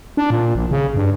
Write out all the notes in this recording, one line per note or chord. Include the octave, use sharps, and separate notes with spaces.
D4
A#2
A#1
C#3
G2